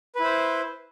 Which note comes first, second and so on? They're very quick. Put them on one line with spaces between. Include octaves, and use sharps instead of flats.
B4 E4 C5